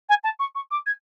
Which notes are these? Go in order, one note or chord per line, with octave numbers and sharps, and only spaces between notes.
G#5
A5
C#6
C#6
D6
G#6